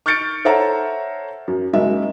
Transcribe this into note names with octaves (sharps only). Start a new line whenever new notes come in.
C#6 F6 G6 A6 C#7 D7
A4 C5 C#5 E5 F#5 A#5
F#2
F#1 F#2 G#3 E5